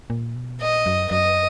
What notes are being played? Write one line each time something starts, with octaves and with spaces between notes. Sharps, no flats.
A#2
B2
A#2 D#5
F#2
F#2 D#5